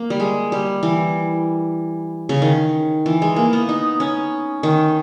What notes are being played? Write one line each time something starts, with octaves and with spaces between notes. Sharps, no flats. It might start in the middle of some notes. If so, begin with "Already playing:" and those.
Already playing: A#3
G3
G#3
G3
E3
C#3
D#3
E3
G#3
A#3
B3
D#4
C#4
D#3